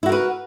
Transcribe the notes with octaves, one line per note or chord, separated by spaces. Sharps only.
E4 F#4 A#4 B4